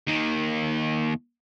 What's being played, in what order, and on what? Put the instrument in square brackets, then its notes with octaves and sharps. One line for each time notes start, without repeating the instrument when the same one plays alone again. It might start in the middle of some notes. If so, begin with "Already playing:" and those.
[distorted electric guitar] D#2 D#3